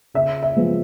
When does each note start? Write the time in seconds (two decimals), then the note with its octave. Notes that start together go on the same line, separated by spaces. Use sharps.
0.14 C#3 E5
0.43 E5
0.56 F3 G#3 B3